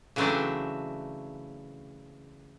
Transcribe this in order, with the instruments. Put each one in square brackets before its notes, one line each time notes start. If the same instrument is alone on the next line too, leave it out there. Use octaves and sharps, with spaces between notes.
[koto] C#3 E3 F#3 A3 C4 D4